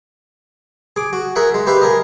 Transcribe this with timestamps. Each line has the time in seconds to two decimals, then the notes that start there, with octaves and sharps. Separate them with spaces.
0.96 G#4 D6
1.13 F#4
1.36 G#4 A#4 E5 F#5
1.54 G#3
1.67 G4 B4 E5 F5
1.82 G#4 A#4 D#5